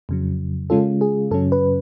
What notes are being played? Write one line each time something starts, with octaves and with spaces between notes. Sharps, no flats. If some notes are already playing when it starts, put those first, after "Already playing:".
F2 C#3 F#3
C#3 G#3 C#4 F4 A4
G#4
F#2 C#3 F#3 C#4 A4
B4